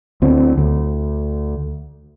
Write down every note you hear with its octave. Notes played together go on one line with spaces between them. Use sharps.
D2 C4
D2